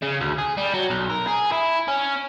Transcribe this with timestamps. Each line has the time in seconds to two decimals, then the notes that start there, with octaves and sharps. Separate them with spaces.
0.02 C#3
0.21 D2
0.38 G#4
0.57 G3
0.74 F#3
0.90 B1
1.10 A#4
1.27 G#4
1.52 E4
1.88 C#4